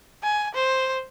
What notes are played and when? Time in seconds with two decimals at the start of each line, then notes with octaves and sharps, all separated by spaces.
0.23 G#5
0.54 C5